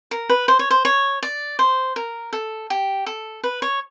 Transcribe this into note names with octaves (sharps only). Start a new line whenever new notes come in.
A#4
B4
C5
C#5
C5
C#5
D5
C5
A#4
A4
G4
A4
B4
C#5